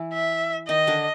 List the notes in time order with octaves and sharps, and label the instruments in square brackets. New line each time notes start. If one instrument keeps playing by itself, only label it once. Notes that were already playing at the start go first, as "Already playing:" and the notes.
Already playing: [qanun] E3 E4
[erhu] E5
[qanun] D#3 D#4 [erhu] D#5
[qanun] D3 D4